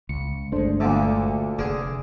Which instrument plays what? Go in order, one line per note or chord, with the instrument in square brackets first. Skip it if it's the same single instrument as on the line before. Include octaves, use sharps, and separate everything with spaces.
[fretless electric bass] C#2 [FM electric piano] C#7
[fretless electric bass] G1 G#3 [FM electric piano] A3 D4 C5
[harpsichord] D2 A#2 D3 [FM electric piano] E5 A5
[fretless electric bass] F1 [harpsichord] D3 G#4 A#4